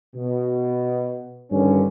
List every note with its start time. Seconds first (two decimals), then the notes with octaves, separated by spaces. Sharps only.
0.16 B2
1.51 G2 D3 D#3 C#4